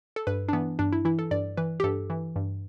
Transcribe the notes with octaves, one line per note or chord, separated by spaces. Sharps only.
A4
G2 B4
D4
E3 B3
G2 D4
E4
E3 E4
A4
G2 D5
E3 B4
G4
G2 A4
E3
G2